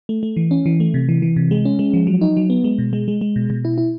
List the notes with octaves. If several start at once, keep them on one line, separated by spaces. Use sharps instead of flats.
A3
A3
E3
C#4
E3
A3
C3
E3
E3
C3
G#3
C#4
G#3
F3
F#3
D#4
F#3
B3
G#3
B2
G#3
G#3
G#3
B2
B2
E4
E4